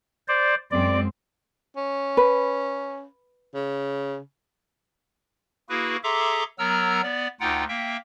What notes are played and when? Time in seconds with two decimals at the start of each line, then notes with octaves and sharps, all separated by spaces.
0.28 C5 D5
0.71 F#2 G#3 C4 D5
1.76 C#4
2.17 B4
3.54 C#3
5.69 A#3 E4 F#4 G#4 B4
6.04 G#4 A4 E5 A#5 C6 D6
6.58 F#3 B3 A#4 A#5 E6 F6
7.02 B3 D5
7.40 D2 D#4 F4 F#5 G5
7.68 A#3 E5 G5